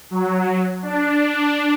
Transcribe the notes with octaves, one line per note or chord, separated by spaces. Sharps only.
F#3
D4